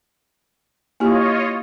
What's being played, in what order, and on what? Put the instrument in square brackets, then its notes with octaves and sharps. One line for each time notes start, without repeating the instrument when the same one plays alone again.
[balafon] A#3 E4 G4 [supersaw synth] F4 C#5 D#5